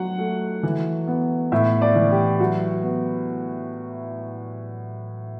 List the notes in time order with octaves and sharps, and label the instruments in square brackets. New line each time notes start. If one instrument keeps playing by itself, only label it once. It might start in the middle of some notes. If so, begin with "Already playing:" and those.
Already playing: [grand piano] F#3 [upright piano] F#5
[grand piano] A3
E3
B3
[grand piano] A2 [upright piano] E5
[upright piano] D5
[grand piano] E3
[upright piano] G4
[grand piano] F#3 [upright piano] F#4
[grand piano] B3